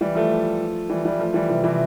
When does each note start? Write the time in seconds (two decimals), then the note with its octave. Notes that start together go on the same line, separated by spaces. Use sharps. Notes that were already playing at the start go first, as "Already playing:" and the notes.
0.01 E3 G3
0.15 F3 A3
0.90 E3 G3
1.05 E3 G3
1.19 F3 A3
1.34 E3 G3
1.49 C3 E3
1.64 C3 E3